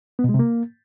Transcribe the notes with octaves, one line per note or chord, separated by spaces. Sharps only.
B3
B2
G#3
C3
A#3